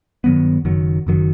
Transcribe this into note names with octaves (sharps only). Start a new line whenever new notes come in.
G2 D#3 F#3 B3
F#1 F#2 D#3 F#3
F#1 F#2 D#3 F#3